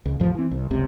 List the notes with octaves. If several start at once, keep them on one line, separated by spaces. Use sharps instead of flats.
C#2
A1 F2 F3
E3 C4
C2
F#1 C#2 C3